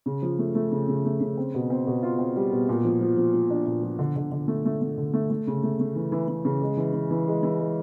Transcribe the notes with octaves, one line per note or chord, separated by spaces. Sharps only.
C#3
F3
A3
A3
C#3
C#3
A3
C#3
C4
B2
C4
B2
F4
C4
G3
B2
A#2
F3
F3
F3
F3
D4
A#2
F3
D3
D3
D3
A3
A3
A3
D3
A3
A3
C#3
A3
A3
E3
E3
E3
C#3
G#3
E3
E3
E3
G#3
E3
G#3